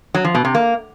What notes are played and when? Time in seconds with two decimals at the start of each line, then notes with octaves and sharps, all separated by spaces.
0.15 F#3
0.25 F3
0.35 B2
0.45 C3
0.55 A#3